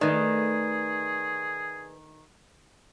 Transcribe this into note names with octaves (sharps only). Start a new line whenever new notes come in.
D#3 A3 D#4 G#4 B4 D5